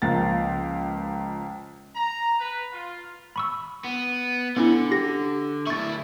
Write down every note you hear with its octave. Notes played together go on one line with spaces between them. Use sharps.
C#2 F3 A#3 A6
A#5
B4
F4
B5 C#6 E6
B3
D3 B3 C#4 E4
G4 A#6
D2 E4 C#6 A6